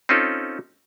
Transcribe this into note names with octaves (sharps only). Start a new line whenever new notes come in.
C4 C#4 D#4 F4 A4